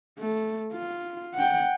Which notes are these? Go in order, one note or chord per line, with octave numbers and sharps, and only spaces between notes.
A3
F4
F#5 G5